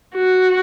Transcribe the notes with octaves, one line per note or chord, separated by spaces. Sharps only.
F#4